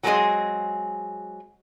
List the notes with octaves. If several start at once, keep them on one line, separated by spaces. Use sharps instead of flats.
F#3 G#3 A3 C4 G#4 D#5